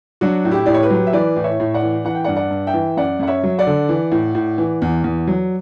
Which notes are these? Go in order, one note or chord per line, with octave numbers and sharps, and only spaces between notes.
F#3 D4 F#4
A2
E4 G4
A2 D5
C#5
G4 B4
F#3
E5
E3 B4 D5
A2
C#5 E5
A2
D5 F#5
E3
E3 F#5
G5
D5 F#5
G2
D5 F#5
G2
E5 G5
E3
F#2 D5 F#5
F#2 F#5
C#5 E5
F#3
D5 F#5
D3
E3
A2
A2
E3
E2
E2
F#3